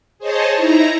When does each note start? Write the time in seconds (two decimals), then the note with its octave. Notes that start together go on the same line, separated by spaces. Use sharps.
0.18 G#4 C5 C#5 D#5 A5
0.54 D#4 E4 A#5